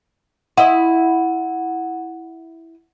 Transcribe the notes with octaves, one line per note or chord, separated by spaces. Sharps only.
E4 D#5 F#5